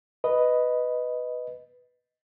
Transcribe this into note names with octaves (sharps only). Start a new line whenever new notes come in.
B4 D#5